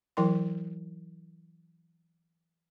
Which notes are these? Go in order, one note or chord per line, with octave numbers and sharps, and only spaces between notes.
E3 F#3 E4 A#4 G5 C6